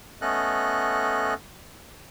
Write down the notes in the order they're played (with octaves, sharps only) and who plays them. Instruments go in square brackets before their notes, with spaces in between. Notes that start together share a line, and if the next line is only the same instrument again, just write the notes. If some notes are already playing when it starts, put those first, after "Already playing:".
[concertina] A3 B3 C#4 A4 D#5 F#6